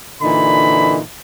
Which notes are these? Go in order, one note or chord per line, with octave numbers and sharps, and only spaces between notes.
A#2 D3 E3 D#4 B5